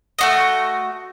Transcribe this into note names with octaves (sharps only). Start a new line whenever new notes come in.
A3 F#4 D#5